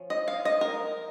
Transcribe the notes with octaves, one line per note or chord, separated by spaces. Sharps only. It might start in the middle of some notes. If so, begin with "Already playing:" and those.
Already playing: F3 C#4
D#5
F5
D#5
A#4